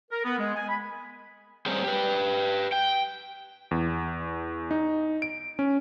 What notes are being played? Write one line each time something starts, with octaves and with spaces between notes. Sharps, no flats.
A#4
B3
G#3
G#5
B5
G3 C4 G#4 A#4 C5 C#5
G4 B4
G5
E2
D#4
D7
C#4